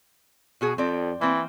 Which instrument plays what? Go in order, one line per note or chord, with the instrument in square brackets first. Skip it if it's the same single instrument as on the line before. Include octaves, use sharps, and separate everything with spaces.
[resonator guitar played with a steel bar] B2 F#4 G#4
[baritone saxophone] F2 [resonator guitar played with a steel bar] C4 D5
[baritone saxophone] E3 [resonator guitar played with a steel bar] A#3 C4